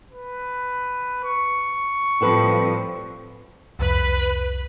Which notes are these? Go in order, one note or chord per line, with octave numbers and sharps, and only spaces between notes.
B4
C#6
A2 F3 G3 C4 A4 B4
C2 F2 B4 B5